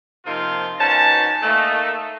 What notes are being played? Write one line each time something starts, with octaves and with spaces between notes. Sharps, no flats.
C3 F3 A#3 D#4 F4
G#2 B2 C#4 A5
A3 A#3 D#4